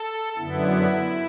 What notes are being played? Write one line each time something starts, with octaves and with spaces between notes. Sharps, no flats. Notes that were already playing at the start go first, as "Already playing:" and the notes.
Already playing: A4
F#2 D3 B3 E4